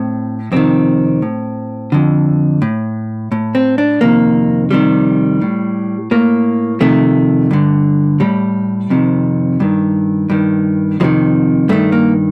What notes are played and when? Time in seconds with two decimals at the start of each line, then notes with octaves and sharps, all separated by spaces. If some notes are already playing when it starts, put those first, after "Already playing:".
Already playing: A2 C4
0.52 F2 C3 D#3 C4
1.22 A2
1.92 F2 D3
2.62 A2
3.32 A2
3.55 C4
3.78 D4
4.01 F2 C3 D#3 A#3
4.71 F2 C3 D#3 G3
5.41 A2
6.11 A2 A#3
6.81 F2 C3 D#3 A3
7.51 G2 D3
8.20 A2 G3
8.90 F2 C3 D#3
9.60 G2 D#3
10.30 G2 D#3
11.00 F2 C3 D#3 F3
11.69 G2 D#3 A3
11.92 A#3